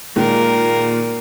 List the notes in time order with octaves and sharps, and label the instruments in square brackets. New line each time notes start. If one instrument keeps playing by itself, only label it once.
[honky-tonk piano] A#2 D#3 G#3 [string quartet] A#3 A#4